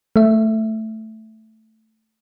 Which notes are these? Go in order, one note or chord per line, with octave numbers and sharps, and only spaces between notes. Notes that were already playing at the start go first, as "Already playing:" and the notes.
A3 E5